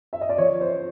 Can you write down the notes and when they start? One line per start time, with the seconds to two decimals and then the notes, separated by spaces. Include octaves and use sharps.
0.13 E5
0.21 D#5
0.29 D5
0.38 F3 C#5
0.61 C5